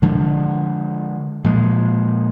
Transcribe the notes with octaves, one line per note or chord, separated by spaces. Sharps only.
D3 F3 G#3
A#2 F3 G#3